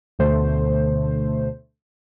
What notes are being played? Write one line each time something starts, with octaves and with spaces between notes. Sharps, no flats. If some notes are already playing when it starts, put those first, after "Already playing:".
D2 B2 D3 A3 C5